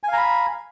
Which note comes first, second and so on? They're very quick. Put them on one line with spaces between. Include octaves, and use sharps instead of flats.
G#5 F5 A#5 B5